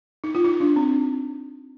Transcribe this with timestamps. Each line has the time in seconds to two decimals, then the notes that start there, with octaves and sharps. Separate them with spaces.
0.24 D#4
0.35 F4
0.45 D#4
0.60 D4
0.76 C4